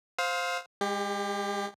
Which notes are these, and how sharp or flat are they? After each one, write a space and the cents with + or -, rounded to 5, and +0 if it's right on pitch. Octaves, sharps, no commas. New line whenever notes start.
C5 +0 F5 +15 E6 -45
G#3 -30 G4 +25